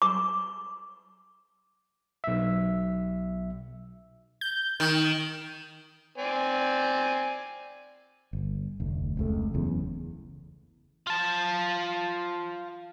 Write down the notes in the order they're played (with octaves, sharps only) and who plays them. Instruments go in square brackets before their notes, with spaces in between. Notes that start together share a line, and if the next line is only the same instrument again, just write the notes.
[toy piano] D6
[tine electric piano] B1 E5
[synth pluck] G6
[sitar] D#3
[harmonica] C4 D5 G#5
[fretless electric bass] G1
F1 D2
F1 C#2 A3
F#1 E2 C#3
[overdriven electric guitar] F4 A5